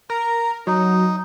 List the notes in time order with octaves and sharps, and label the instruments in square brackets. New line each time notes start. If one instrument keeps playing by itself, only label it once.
[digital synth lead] A#4 [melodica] A#5
[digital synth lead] F#3 [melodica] D#4